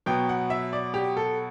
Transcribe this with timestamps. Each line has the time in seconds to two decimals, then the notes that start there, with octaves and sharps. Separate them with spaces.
0.06 B2 F#3 B3 G5
0.29 F#5
0.50 E5
0.73 D5
0.94 G4
1.17 A4